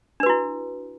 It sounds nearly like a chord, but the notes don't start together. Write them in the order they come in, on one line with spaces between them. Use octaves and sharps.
D4 B4 F#4 E4